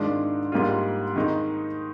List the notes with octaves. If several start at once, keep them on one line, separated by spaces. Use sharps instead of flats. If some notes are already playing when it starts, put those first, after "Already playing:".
Already playing: G#2 D#3 G#3 D4 F4
G#2 G3 A#3 F4
D#3 G#3 D#4